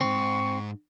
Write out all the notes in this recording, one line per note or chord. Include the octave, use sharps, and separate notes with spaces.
D2 G#2 C4 C#6